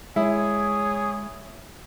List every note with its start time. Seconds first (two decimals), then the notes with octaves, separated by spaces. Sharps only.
0.16 G#3 E4 G#4 C#5